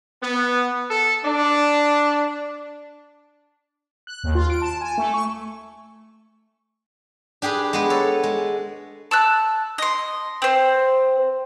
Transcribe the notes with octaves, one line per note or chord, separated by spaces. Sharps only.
B3
A4
D4
F#6
D#2
F4
D7
A5
G#5
A3
C#6
D4 G4 G#4 B4
G#3 B3 B4
A4 C#5
G#3
A5 E6 F#6
D#5 C6
C4 C5